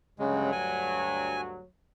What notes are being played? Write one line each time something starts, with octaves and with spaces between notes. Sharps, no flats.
D2 G2 C#3 F#3 G#3
G#5